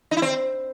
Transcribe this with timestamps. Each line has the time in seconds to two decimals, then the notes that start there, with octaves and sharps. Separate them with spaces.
0.11 D#4
0.17 E4
0.22 C4